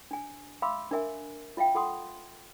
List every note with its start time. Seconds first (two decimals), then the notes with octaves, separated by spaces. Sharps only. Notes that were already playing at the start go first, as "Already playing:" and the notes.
0.11 D4 G#5
0.62 E5 F5 B5 C6 D6 E6
0.91 D4 A#4 E5 G#5
1.57 F4 E5 F5 G5
1.75 F4 A4 F#5 C6 D#6